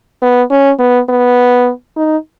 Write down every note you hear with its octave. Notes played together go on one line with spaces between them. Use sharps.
B3
C#4
B3
B3
D#4